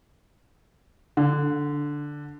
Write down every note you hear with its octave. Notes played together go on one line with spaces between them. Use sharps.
D3